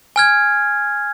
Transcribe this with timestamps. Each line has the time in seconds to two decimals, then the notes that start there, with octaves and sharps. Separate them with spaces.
0.16 G#5 F6 G#6